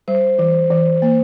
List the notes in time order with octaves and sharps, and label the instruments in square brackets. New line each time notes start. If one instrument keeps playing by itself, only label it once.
[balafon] G3 [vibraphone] C5
[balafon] E3
E3
A#3